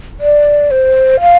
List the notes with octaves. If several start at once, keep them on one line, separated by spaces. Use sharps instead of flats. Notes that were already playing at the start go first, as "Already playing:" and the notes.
D5
C5
F5